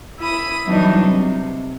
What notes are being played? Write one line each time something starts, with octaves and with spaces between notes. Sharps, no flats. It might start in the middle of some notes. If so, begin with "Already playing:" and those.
E4 B5 D#6
E3 F#3 G3 B3 D4 D#4
C3